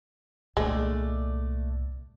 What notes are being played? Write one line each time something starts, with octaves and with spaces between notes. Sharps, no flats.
C2 A#2 G#3 A3 D4 D5